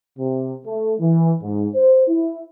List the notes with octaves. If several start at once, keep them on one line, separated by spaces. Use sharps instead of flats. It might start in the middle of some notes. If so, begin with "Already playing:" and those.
C3
A3
E3
G#2
C5
E4